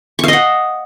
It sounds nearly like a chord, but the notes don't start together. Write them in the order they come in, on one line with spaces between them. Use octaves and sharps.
C#6 F5 D#5 F#5